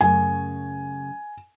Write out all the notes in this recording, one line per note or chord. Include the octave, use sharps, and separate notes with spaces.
F#2 C#3 A3 G#5